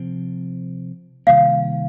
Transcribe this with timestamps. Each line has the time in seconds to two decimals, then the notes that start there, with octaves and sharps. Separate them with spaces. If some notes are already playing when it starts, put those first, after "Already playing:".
Already playing: C3 F3 C4
1.27 C3 D#3 G3 A#3 F5